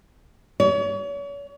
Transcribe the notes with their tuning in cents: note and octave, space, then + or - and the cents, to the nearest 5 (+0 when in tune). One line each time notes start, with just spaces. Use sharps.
C#5 +40